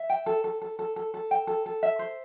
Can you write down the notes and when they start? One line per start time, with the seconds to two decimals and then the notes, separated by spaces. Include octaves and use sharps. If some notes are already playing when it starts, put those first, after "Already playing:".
Already playing: E5
0.10 G5
0.26 A4
0.44 A4
0.62 A4
0.79 A4
0.96 A4
1.14 A4
1.31 G5
1.47 A4
1.66 A4
1.83 E5
1.99 C5